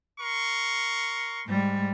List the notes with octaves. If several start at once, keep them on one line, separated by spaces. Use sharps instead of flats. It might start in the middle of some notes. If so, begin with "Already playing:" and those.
A#4 C6 C#6
G#2 G3